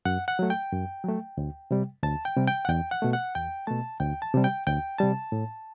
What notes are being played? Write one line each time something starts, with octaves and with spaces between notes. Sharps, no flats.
F#2 F#5
F#5
F#3 A3
G5
F#2
F#3 A3
D2
C3 G3
D2 A5
G5
C3 G3
G5
F#5
E2 G5
F#5
B2 A3
F#5
E2 G5
B2 A3 A5
D2 G5
A5
C3 G3
G5
D2 G5
C3 G3 A5
A2